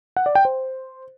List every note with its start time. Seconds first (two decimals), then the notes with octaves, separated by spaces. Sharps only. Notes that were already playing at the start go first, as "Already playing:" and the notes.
0.17 F#5
0.26 D5
0.35 G5
0.45 C5